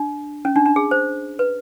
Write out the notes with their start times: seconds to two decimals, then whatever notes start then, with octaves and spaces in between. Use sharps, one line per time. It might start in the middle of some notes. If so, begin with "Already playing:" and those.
Already playing: D4
0.45 C#4
0.56 D4
0.66 D4
0.76 G#4
0.91 C5
1.39 B4